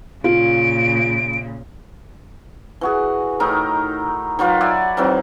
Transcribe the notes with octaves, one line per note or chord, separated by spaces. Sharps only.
A#2 C#3 F4 D7
E3 F#4 G#4
A2 D#3 D#4 A#4
D#3 F#3 F4 B4
D5 E5 F#5 G#5
D#3 E3 F#3 C4